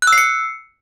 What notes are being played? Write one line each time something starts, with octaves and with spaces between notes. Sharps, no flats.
F#6
E6
C7
C#7